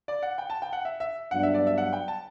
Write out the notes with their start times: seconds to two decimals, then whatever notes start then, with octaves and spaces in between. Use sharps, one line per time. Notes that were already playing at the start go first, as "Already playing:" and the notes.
0.08 D5
0.23 F#5
0.38 G5
0.50 A5
0.62 G5
0.73 F#5
0.85 E5
1.00 E5
1.31 G2 F#3 B3 D4 F#5
1.43 E5
1.54 D5
1.67 E5
1.78 F#5
1.93 G5
2.08 A5